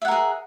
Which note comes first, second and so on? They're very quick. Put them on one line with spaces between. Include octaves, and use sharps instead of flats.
E5 F#5 A#4 G#4